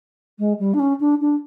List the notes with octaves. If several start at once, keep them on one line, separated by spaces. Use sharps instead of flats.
G#3
G3
D4
C#4
D4
D4